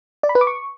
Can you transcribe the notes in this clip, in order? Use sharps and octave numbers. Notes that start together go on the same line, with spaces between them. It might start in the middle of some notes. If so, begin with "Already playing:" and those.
D5
B5
B4
D6
C#6